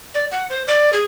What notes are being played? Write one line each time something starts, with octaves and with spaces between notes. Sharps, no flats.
D5
F#5
C5
D5
G#4